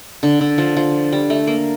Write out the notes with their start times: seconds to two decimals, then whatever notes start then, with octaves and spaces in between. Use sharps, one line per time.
0.23 D3
0.41 D3
0.58 F3
0.77 F3
1.12 G3
1.30 A3
1.47 A#3